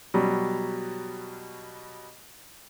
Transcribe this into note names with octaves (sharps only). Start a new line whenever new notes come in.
B2 F#3 G3